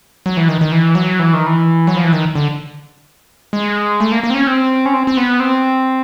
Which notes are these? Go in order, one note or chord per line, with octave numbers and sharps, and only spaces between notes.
F#3
E3
D#3
D#3
E3
F#3
E3
D#3
E3
F#3
F3
E3
D#3
D3
G#3
A3
A#3
A#3
C4
C#4
C4
C#4
C4
C4
B3
C4